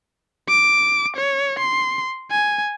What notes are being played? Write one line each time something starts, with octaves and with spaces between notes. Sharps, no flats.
D6
C#5
C6
G#5